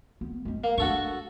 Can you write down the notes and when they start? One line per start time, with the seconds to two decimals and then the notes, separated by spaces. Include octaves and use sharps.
0.21 B3
0.45 G#3 C#4
0.64 A#3
0.78 G#3 D4 F#4 A4 C#6